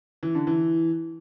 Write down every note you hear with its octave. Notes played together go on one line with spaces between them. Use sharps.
E3
D3
E3